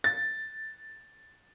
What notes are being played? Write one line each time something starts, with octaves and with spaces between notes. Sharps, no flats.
A6